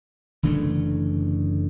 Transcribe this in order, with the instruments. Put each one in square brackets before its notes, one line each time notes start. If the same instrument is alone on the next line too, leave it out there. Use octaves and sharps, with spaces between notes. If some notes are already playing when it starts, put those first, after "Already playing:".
[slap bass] F#1 D3 E3 A3